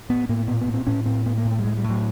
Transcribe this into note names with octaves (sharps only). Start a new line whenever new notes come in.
A2 B3
A2 A#3
A#2 B3
B3
A#2
C4
A2 C#4
A2 C4
A2 B3
A#3
A2
A3
G3
A2 G#3
G3
A2
F#3